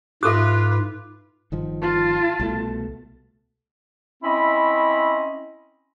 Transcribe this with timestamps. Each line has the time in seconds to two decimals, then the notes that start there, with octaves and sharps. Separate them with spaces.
0.23 G#2 F4 G4 A4 B4 E5 D6 F#6
1.52 G1 D#3 F3
1.81 F4 A5
2.39 C2 B2 A3
4.23 C4 C#4 E4 D#5 E5 B5